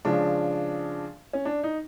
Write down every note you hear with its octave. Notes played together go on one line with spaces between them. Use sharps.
C#3 F3 G#3 D4
C#4
D4
D#4